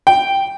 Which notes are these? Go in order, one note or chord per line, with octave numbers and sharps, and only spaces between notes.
G5